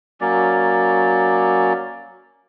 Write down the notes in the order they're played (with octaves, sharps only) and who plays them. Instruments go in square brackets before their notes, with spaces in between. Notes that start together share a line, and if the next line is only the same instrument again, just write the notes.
[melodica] F#3 A#3 C#4 D5